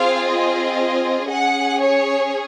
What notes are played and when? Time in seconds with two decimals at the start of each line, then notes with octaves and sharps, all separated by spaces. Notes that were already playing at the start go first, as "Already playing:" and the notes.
Already playing: C4 F4 G#4 F5
0.28 D#5
1.28 C#4 G#4 F#5
1.79 C#5